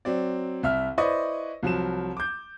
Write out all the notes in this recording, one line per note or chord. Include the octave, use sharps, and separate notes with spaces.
F#3 C4 D5
C2 E5 F6
E4 B4 C5 D5 D#5 C#6
C2 F3 F#3 E7
D6 G6